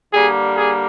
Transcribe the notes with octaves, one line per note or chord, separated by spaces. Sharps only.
D3 G3 A#3 G#4
G#4